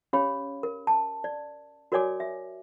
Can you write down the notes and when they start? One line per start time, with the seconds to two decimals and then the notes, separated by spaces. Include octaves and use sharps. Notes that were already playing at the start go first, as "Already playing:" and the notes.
0.13 C#4 G4 C#5 F5 B5
0.63 A#4
0.87 A5
1.24 D5
1.92 F#4 A#4 C#5 D5 G#5 D6
2.20 E5